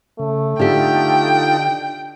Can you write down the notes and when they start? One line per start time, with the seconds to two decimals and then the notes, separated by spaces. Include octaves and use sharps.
0.19 C#3 A3
0.59 D3 D#4 F4 G4 A4 G5